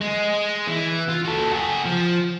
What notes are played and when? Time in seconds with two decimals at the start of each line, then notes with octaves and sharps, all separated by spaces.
0.01 G#3
0.67 E3
1.08 F4
1.25 F#4 A4
1.52 F#4 G#4
1.85 F3